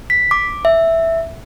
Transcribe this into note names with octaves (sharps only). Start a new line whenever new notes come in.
B6
D6
E5